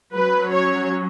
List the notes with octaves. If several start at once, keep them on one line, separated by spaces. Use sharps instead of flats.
F#3 C#4 B4
C#5